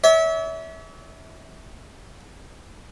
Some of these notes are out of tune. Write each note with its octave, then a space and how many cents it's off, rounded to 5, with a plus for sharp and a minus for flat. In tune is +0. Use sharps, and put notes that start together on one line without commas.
C#5 +45 E5 -25